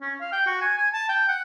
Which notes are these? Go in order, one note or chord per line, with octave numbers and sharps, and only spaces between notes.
C#4
F5
G5
F#4
G#5
G#5
A5
G5
F#5